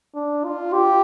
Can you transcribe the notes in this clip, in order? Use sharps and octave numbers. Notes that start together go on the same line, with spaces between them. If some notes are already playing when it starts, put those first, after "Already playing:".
D4
F4
G4